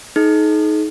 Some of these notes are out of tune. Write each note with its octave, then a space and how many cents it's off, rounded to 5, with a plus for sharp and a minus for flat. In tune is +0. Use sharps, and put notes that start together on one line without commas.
D#4 +15 G#4 +45